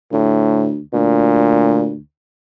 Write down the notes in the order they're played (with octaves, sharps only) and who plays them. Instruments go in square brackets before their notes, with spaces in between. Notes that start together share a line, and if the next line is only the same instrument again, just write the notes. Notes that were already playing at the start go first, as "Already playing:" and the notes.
[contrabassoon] D2 [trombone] A2
[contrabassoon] D2 [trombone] A#2